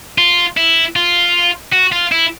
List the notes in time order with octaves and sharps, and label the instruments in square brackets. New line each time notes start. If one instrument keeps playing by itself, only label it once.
[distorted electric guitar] F4
E4
F4
F#4
F4
E4